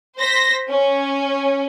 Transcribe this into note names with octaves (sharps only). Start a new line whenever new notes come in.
C5 A#6 B6
C#4